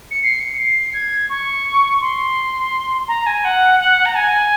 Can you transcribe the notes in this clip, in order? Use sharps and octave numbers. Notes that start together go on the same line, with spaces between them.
C#7
C7
C#7
C7
G#6
C#6
C6
A#5
G#5
F#5
F#5
A#5
G#5